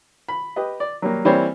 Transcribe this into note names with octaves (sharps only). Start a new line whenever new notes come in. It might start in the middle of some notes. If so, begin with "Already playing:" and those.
B5
G4 B4 D#5
D5
F#3 G3 A#3
E3 G3 A#3 C4 C5 C#5